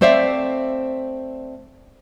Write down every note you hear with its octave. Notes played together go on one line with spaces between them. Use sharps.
A3 C4 C5 D5 E5 F5